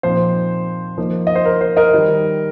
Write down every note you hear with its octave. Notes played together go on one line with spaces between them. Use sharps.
A#2 F3 C4 D#4 C5
F3 A#3 D#4
D#5
C5
A#4
C5
A#4 D#5
D#3 G3 D#4